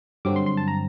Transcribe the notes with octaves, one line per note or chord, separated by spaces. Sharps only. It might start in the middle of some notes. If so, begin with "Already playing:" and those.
G2 D3 F#3 C4 D6
C6
C6
A5
A#5